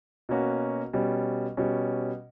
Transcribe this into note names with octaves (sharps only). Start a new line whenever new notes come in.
B2 A#3 C#4 F#4
B2 G3 C#4
B2 G3 C#4